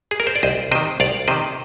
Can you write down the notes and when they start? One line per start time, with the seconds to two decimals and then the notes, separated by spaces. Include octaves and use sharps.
0.11 G#4
0.20 A#4
0.27 C5
0.36 D5
0.43 C2 C5 D#5
0.71 C3 D#3 C5 D#5
1.00 C2 D5 F5
1.28 C3 D#3 C5 D#5